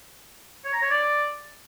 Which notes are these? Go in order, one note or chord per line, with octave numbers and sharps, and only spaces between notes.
C#5
A#5
C#5
D5